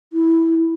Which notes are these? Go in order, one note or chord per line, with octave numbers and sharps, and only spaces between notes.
E4